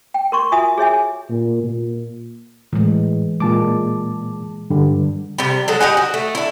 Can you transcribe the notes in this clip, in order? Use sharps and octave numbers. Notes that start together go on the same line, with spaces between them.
G5
A#4 C6 C#6
F4 F#4 A#4 E5 G#5 D#6
G#4 C#5 E5 G#5
A#2
A#2
A2 E3 G#3
A#2 G#3 A5 D6
G2 D3 G3
C3 G3
F#3 G#3 A4 F#5
D#4 G4 F#5 G#5
F#4
A3
D4 E4